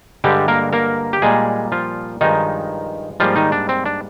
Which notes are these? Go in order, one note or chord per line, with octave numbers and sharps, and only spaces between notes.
G2 D3 G3 G#3 G4
A#3 A#4
A#3 A#4
G4
A#2 G3 G#3 A#3 G#4
F3 F4
G2 D#3 F3 G#3 D#4
G#2 F3 G3 A#3 F4
D#3 D#4
D4
C4
D4